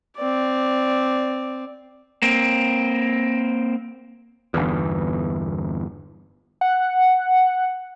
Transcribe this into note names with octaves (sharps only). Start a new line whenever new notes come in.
C4 D5
A#3 C4
G1 E2
F#5